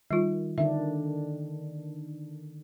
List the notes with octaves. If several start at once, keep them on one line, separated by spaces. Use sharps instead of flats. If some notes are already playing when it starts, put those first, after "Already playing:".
D#3 G3 F4
D3 D#3 D4 E5